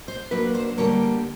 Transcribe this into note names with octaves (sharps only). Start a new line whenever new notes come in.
C5
F#3 A#3 D4 B4
C5
D3 G3 A#3 C#5